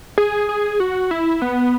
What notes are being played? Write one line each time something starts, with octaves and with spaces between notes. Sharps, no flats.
G#4
G#4
F#4
E4
B3